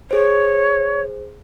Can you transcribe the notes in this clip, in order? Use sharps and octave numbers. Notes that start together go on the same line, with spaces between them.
G#4 C5 C#5